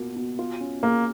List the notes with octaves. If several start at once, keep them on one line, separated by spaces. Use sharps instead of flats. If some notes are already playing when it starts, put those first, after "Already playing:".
Already playing: B2 A#3 F4
B2
F4
C#4
A#3 G#4